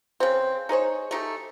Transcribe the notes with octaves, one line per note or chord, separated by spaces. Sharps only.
C#3 C4
D#4 G#4 C5 C#5
A3 D#4 G4